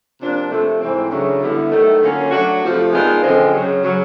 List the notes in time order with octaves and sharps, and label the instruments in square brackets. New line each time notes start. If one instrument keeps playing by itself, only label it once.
[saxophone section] C3 F3 A#3 D4
C3 F3 A3
G#2 E3 A3 C4
F#2 C#3 F#3 A3 D4
D3 G3 B3 E4
D#3 F#3 A3
D3 F#3 A#3 C#4 F4
F#3 A3 D4 F#4
F2 C3 F3 A3
D#3 G#3 B3 D4 F4
F#2 D3 F3 G#3 C4
F#2 C#3 F#3
C#3 F#3